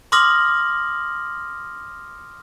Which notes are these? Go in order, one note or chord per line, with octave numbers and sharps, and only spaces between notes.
C6 D6 D#6 F6 A#6 F#7